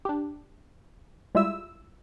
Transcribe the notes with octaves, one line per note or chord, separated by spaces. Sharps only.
D4 G4
G3 G#3 E4 F4 E5 E6